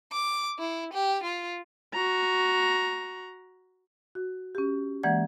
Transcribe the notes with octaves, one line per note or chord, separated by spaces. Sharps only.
D6
E4
G4
F4
F#4 A#5
F#4
C#4 G4
E3 G#3 A#3 D5 F#5 G#6